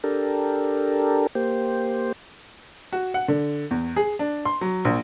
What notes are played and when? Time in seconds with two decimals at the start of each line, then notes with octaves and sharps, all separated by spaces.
0.04 D4 G4 A4 A#4
1.35 A#3 G4 C5
2.93 F#4
3.14 F#5
3.28 D3
3.71 E2
3.96 G#4
4.19 D4
4.45 C6
4.61 F#3
4.85 A#1